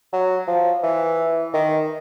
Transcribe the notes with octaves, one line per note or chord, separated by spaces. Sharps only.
F#3
F3
E3
D#3